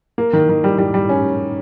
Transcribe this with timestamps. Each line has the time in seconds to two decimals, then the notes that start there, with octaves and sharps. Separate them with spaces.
0.18 A#3
0.33 D#3
0.49 D#3
0.64 G3
0.78 G3
0.94 G3
1.09 C#4